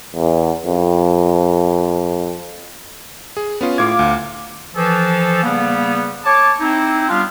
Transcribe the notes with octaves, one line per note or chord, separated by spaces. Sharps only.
E2
F2
G#4
B3 C#4 F4
A2 F4 F5 D6 G#6
D2
E3 F3 A4
C#3 G3 A#3 B3
C#5 A5 D6
C4 D#4 E4
G3 B3 D4 F4 G4 F5